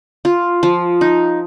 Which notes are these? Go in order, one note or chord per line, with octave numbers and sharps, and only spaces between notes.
F4
F3
D#4